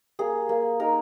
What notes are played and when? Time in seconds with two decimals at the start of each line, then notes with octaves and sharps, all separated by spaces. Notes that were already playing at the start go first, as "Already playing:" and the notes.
0.19 A#3 G#4
0.49 A#3
0.80 D#4 A#4